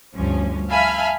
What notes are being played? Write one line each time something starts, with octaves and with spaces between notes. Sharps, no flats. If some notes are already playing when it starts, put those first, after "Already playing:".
D2 G2 F3 C#4
E5 F5 G#5 A5 B5 F6